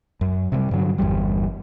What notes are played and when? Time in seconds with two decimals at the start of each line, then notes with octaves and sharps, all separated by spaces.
0.21 F#2
0.52 C3 F#3 G3
0.71 G2 D3 F#3
0.98 G1 E2 G3